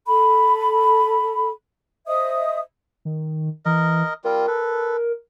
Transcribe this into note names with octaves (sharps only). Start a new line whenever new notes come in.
A4 B5
C5 D#5 E5 D#6
D#3
E3 A#4 D#5
G3 C4 F4 A#4
A4 B4